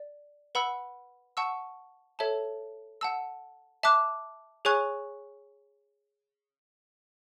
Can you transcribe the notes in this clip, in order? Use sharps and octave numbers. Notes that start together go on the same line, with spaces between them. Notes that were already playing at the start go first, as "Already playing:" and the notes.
Already playing: D5
B4 F#5 B5 E6
F#5 A5 C#6 E6
A4 C#5 E5 A5
F#5 A5 E6
E5 A5 D6 F#6
G#4 C#5 G#5 C#6 F#6